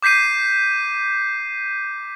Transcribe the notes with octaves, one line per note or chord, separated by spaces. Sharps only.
D6 G6 B6 C7 D#7